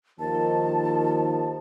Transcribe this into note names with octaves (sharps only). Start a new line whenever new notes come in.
D#2 D#3 F3 A5